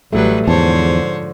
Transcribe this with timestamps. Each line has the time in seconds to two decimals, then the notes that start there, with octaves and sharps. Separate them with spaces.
0.13 A1 F#3 G3 A3 B4
0.47 E2 G#2 D3 F3 C5 C#5 A5